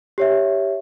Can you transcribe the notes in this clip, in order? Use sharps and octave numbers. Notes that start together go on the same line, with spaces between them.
G4 C#5 E5